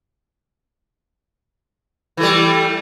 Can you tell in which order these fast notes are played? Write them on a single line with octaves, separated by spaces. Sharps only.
E3 A3 G3